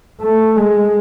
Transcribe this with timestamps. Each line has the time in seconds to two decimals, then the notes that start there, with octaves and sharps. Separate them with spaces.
0.21 A3
0.57 G#3